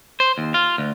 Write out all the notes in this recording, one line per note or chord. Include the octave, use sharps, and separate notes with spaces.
C5
D#2
F4
D2